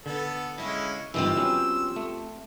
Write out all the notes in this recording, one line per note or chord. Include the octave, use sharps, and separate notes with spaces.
D3 B3 A4
G#3 C#4 E4 D#5 F5
G1 D#3 E3 C4 F4 G4 E6
F#3 B3 C#4
A3